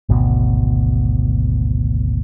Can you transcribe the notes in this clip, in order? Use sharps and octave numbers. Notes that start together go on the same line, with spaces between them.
G#1 D2 B2